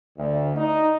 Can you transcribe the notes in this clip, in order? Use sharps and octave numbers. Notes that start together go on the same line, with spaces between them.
D2
D#4